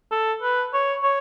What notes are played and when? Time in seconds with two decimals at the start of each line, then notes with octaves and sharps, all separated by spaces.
0.12 A4
0.42 B4
0.73 C#5
1.03 C#5